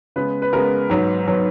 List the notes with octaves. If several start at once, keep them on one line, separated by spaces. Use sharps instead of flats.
C#3 G#3 B3 B4
B4
C#3 G#3 B3 A#4
G#2 F#3 B3
F#3 B3